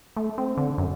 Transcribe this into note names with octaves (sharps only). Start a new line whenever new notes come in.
A3
C4
D3
F#2